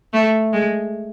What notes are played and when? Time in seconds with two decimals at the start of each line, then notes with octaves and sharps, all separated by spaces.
0.13 A3
0.53 G#3